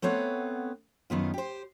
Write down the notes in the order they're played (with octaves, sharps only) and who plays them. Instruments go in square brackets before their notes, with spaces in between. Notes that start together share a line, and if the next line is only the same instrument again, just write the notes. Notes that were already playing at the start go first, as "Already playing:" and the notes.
[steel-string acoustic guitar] A3 B3 C4 C#5 F#5
F#2 D#3 B3 F4
G4 C5